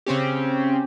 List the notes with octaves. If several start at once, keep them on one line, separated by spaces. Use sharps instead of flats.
C#3 C4 C#4 G4